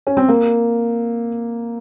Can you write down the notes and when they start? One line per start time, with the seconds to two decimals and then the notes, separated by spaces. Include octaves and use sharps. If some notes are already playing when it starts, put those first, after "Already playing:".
0.07 C#4
0.17 C4
0.29 A#3